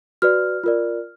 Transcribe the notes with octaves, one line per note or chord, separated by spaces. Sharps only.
F#4 B4 D5 F6
F4 A#4 D5